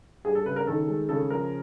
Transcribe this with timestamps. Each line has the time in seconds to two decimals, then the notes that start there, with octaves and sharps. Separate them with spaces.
0.25 G3 G#4
0.35 A4
0.46 C#3 B4
0.56 A#4
0.67 D#3 A4
0.88 G#3
1.09 C#3 A4
1.30 F3 A#4